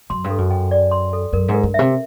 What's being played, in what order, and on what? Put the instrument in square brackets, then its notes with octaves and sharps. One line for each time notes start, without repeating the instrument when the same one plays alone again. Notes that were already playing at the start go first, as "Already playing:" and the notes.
[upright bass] F#2 [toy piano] C6
[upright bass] G2
[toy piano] A4
[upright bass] F#2
[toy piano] G5
D5
C6
A4
[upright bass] F#2 [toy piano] A#4
[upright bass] G#2
[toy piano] A#4
[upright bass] G2
[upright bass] C3 [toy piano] E5